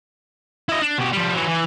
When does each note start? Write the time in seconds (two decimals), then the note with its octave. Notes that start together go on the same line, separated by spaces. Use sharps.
0.69 E4 D#5
0.82 D4
0.99 B2 G4
1.13 F3 G3
1.34 E3 F#3
1.47 E3